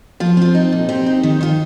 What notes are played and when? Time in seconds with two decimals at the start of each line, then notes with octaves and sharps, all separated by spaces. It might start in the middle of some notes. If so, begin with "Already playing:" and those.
0.20 F3 F4
0.37 C4 F4
0.55 D#4
0.72 A#2
0.89 C4 G4
1.06 D#4
1.23 D#3
1.41 D#3 F4